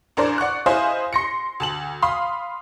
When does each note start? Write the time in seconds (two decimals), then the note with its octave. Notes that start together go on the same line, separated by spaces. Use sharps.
0.17 A1 D4 A#4 C5 D5
0.38 D5 F#5 C#6 F#6
0.66 E4 C5 D#5 F5 G#5 D#6
1.13 C6 A#6 C#7
1.60 D2 A5 F#7
2.02 F5 B5 C6 D#6